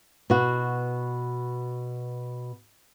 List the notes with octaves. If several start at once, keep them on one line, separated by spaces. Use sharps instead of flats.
B2 F#4